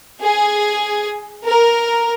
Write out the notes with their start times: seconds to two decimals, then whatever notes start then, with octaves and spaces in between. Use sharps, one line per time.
0.23 G#4
1.45 A#4